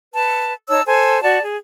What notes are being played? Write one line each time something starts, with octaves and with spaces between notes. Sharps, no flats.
B4 A5
D#4 C#5 A5 E6
A4 C5 G#5
F#4 D5 A5
G#4